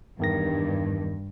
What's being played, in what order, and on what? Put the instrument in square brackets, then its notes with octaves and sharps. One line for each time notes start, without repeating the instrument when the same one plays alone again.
[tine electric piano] E2 D#3 A#6 [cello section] G2